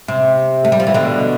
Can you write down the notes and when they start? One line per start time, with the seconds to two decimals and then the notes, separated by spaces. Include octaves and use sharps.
0.08 C3
0.65 A3
0.72 G3
0.80 F3
0.87 E3
0.94 B2 D3